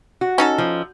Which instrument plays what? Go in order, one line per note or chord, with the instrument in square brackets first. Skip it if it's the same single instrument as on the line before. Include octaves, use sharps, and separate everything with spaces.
[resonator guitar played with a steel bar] F#4
[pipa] C#4 D#4 A4
[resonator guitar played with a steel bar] F3